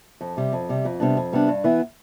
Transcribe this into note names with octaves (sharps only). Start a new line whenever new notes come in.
F2
C3 G3
F2
C3 G3
F2
C3 G3 B3 D4
F2
C3 G3 B3 D4
G2
E3 B3 E4